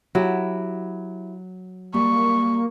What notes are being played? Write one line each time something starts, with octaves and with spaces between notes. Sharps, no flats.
F#3 E4 G4
G3 A#3 C#6